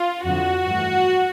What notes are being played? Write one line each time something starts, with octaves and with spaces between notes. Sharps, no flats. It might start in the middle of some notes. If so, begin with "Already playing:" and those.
Already playing: F4
F2 D3 F3 F#4
G2 E3 A3